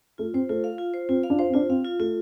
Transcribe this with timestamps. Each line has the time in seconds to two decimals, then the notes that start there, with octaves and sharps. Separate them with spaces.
0.18 A3 F4
0.34 C4 C5
0.49 A3 F4
0.64 F5
0.78 F4
0.94 C5
1.09 C4 F4
1.23 F5
1.30 D4
1.39 F4 C5
1.50 C4
1.53 D4 F4
1.69 C4 F5
1.85 F4
1.99 A3 F4